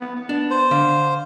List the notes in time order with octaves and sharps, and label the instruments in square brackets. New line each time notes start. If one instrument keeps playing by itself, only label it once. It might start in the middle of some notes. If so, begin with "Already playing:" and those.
[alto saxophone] B3
B3
[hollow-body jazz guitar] D4
[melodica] C5
[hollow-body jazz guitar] D3 [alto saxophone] F5